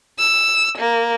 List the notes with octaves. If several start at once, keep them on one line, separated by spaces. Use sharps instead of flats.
E6
A#3